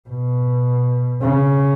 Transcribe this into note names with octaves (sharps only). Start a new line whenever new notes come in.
B2
C#3